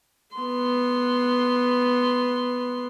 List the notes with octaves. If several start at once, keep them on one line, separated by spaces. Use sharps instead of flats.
B3 C6